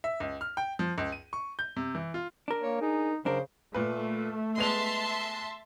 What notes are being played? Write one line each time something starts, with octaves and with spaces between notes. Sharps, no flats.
E5
C#2
F6
G5
F3
C#2
D#7
C#6
G6
C3
E3
F4
D4 A#4
A#3 C#5
D#4 G#4
F#2 C#3 D4 A#4 C5
A#2 A3 B4
G#3 B3 E5 A5 C6 F7